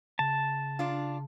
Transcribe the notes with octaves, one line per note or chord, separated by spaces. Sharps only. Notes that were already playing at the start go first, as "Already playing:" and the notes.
C#3 A5
D4 F4